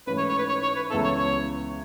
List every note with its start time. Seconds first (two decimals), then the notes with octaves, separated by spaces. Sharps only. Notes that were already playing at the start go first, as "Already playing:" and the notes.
0.07 G#2 E3 A3 C#4 B4
0.18 C#5
0.29 C#5
0.38 B4
0.49 C#5
0.63 C#5
0.76 B4
0.90 C#2 C#3 E3 B3 E4 A4
1.04 C#5
1.18 C#5